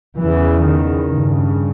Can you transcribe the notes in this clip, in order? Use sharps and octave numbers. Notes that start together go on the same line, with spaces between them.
E2 C#3 E3
D#3
G2 C#3